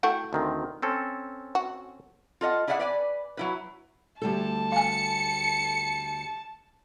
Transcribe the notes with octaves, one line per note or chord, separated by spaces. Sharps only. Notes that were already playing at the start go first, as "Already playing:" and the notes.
A3 E4 F#4 G5
D2 D#3 C4
C4 C#4 A4
F#4
F4 A4 D#5 F#5
E4 G#4 D5 E5 F#5
B4 D5 G#5
F#3 E4 B4
D2 G3 A4 A5
F5 G#5 C#7